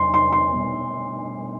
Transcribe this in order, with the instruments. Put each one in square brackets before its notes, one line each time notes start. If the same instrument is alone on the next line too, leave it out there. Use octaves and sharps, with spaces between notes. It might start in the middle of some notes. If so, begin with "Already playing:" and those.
Already playing: [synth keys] E2 F#3 [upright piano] C6
[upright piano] C6
C6
[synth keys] B2 G3 B3